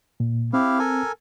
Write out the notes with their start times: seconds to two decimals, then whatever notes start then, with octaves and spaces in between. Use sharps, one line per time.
0.20 A#2
0.53 C4 E4 G4 F5
0.79 A4 A#4 G#5